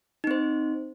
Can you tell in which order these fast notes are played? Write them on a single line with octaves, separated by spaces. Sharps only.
D#4 C4 C5